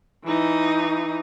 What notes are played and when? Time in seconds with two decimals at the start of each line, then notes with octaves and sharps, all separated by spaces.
0.25 E3 D#4